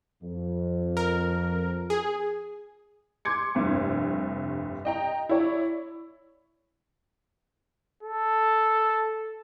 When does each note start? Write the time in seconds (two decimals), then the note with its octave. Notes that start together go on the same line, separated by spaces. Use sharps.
0.23 F2
0.97 A#4
1.90 G#4
3.25 C6 D6 G#6 C#7
3.55 F1 C2 G2
4.85 D#5 G5 A#5
5.29 E4 C#5 D5
8.03 A4